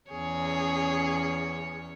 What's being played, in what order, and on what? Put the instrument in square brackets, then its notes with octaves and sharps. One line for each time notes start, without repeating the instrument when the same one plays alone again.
[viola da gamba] E2 C#4 C#5 [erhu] G#4